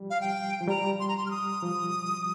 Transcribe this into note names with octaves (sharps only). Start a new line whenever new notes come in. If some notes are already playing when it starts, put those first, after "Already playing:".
Already playing: F3 G3
F5
G5
F3
G3 A#5
C6
A#5
C6
F6
D#6
F3